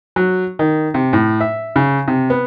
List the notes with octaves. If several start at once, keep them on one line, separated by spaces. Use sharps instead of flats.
F#3
D#3
C3
A2
E5
C#3
C3
B3